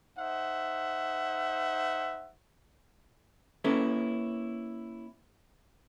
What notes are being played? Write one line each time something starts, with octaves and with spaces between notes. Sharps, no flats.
D#4 C5 E5 F#5
A#3 C#4 E4 A4 B4